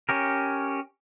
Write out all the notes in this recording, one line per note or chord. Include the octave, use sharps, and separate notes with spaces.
C#4 G4 A#4